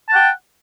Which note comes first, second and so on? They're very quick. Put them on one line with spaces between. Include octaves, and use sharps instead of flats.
A5 F#5 G5